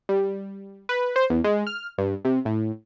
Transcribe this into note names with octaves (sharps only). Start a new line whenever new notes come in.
G3
B4
C5
E2
G#3
F6
G2
C3
A2